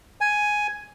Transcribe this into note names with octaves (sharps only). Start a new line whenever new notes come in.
G#5